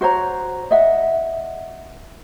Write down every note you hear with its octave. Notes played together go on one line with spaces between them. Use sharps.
F#4 C5 C#5 A#5
D#5 E5 F#5